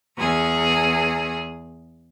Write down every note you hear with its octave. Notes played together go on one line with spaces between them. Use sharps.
E2 G#4